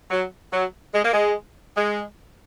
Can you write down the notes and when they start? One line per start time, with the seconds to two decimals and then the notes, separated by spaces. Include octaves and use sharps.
0.10 F#3
0.51 F#3
0.93 G#3
1.03 A#3
1.13 G#3
1.76 G#3